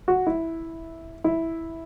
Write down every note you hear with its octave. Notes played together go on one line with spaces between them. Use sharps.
F#4
E4
E4